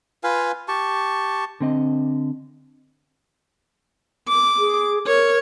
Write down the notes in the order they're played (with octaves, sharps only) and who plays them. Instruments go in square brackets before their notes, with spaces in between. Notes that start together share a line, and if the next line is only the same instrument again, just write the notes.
[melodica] F4 B4 F5 G#5
G4 A5 C#6
[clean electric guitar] D3 C4 D#5
[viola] D6
[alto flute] G#4
[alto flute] A#4 [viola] C#5